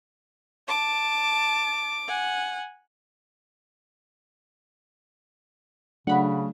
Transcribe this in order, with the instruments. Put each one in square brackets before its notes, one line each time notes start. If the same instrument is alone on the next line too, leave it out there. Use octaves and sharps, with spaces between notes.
[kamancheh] A5 [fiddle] D6
[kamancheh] F#5 G#5
[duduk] C#3 [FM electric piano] F#3 A3 D4 [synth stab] F#5 B5